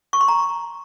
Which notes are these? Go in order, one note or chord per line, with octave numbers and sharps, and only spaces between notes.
C#6
C6
A#5